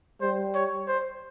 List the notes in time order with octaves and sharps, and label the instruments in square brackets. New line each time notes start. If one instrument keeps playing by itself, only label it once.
[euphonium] G3 [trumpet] C5
[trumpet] C#5
C5